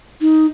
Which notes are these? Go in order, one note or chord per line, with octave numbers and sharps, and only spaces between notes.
D#4